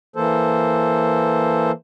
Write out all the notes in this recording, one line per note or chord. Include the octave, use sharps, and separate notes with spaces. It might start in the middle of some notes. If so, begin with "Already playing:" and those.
E3 A#3 A4 C5